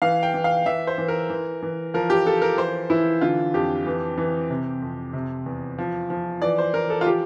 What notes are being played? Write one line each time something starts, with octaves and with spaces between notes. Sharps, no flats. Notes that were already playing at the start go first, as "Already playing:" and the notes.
E3 F5
G5
E3
F5
E3 E5
C5
E3
A#4
E3
E3
F3 A#4
G4
F3 A4
A#4
E3 C5
E3 E4
D3 F4
F2 G4
E3
E3
C3
F2
C3
E2
F3
F3
E3 D5
C5
E3 A#4
A4
F4
F3 G4